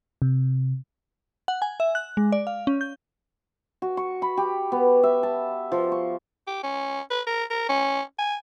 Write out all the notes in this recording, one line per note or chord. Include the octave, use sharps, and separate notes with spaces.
C3
F#5
G#5
E5
F#6
G#3
D5
F5
C#4
G6
F#4
C#6
B5
G4
B3
E5
A5
F3
C#6
G4
C#4
B4
A#4
A#4
C#4
G#5